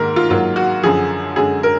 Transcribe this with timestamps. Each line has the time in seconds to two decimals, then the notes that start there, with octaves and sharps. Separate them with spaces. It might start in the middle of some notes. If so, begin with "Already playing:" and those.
Already playing: G#2 D#3 A#3 A#4
0.16 F4
0.30 G#2 F#3 A#3 F4
0.56 F#4
0.83 F#2 D3 F3 G#4
1.36 F#2 D3 G#3 G#4
1.63 A#4